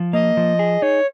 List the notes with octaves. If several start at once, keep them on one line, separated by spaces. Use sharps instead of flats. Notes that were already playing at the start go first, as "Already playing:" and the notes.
Already playing: F3
A#3 D#5
F3
G#4
D#4 C#5